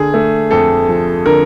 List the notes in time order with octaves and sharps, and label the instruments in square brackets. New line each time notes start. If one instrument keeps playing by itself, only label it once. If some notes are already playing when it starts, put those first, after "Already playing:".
Already playing: [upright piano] D3 G#4
A3
F2 A4
F3
D3 A#4